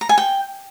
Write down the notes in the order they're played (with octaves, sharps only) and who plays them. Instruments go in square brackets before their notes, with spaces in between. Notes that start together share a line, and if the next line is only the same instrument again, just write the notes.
[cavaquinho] A#5
G#5
G5